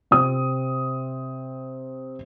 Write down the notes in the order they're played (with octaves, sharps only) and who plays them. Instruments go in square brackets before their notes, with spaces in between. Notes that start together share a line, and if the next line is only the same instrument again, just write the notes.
[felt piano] C3 C4 D#6